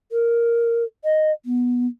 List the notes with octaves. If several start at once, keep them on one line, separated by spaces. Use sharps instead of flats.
A#4
D#5
B3